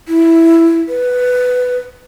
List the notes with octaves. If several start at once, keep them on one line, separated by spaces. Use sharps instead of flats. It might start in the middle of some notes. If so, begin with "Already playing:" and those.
E4
B4